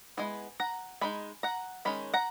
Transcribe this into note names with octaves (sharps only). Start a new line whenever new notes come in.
G#3 B3 E4 G#5
F#5 A#5
E3 G#3 D#4 G#5 B5
F#5 A#5
D#3 G#3 C#4 B5
F#5 A#5